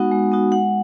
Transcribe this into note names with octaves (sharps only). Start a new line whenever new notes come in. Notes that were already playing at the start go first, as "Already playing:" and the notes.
Already playing: G#3 B3 D#4 F#4 F#5
G#3
B3 D#4 F#4
G#3 F#5